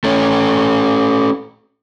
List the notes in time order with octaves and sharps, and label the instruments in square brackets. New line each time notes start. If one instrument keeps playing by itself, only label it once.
[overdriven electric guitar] A3 C#4